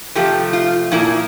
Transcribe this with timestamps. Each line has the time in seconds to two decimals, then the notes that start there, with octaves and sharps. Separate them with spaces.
0.15 C3 F3 A3 G4
0.53 F4
0.92 A#2 F3 A#3 E4